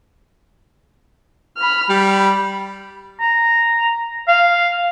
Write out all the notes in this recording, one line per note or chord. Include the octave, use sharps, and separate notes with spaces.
B5 F6
G3 B5
A#5
F5